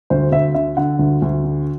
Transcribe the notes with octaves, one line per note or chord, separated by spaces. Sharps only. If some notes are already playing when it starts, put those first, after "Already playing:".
D2 C5
D2 E5
D3 E5
D3 F#5
D2
D2
D3